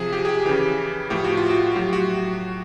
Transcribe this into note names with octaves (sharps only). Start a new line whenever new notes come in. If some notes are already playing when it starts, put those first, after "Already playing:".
Already playing: C3 F3 G#4
G4
G#4
G4
C#3 E3 G4
A2 F3 G4
F#4
F4
F#4
A2 F#3 G4
F#4